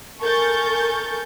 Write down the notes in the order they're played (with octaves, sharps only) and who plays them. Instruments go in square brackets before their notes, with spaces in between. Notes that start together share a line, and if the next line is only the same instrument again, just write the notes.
[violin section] A4 A#4 G#5 C#6 G6 A6